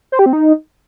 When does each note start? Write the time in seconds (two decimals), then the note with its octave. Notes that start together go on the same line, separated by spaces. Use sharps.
0.12 C5
0.19 G4
0.26 C4
0.33 D#4